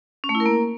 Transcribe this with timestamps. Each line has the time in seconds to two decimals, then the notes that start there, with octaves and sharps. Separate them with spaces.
0.24 C#4
0.29 A3
0.35 E4
0.40 A#4
0.46 A#3